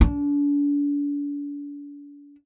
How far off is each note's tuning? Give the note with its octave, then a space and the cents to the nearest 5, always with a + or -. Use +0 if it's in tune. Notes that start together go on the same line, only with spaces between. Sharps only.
D4 -40